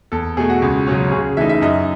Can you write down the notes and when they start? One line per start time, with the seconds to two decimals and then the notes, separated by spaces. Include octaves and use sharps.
0.12 E2 A4
0.37 B2 A3 G#4
0.50 F#4
0.62 C#2
0.87 C#3 F#3 C#4
1.12 C#3 G#4
1.37 E3 A3 D#4 E5
1.49 E5
1.62 F#2 D#5